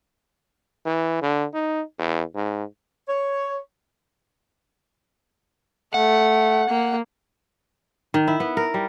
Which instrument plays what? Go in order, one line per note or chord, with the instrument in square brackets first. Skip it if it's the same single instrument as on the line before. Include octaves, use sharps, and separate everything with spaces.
[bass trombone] E3
D3
D#4
E2
G#2
[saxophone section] C#5
[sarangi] A3 [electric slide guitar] F#5
[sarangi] A#3
[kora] D#3
E4
B3
A#4
G3